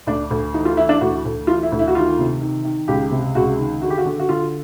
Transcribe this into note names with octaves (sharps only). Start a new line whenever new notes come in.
D2 D4
D2
E3 D#4
F4
E3 E4
D4
D2 F#4
D2
E3 F4
E4
D2
E4
F#4
D#3 F4
C3
D#3
D#3
C#2 G4
C3
C#2 F#4
D#3
D3 F#4
G4
F#4
D3
F#4
D3 F4